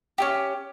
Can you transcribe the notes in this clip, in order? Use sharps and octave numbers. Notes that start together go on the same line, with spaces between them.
C#4 E4 G4